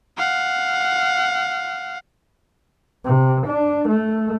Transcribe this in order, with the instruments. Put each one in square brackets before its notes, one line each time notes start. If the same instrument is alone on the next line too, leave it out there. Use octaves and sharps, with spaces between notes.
[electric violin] F5 F#5
[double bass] C3
D4
A3